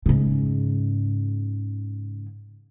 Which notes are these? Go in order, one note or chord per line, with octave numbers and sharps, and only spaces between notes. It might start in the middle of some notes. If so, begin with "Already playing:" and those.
G#2 C#3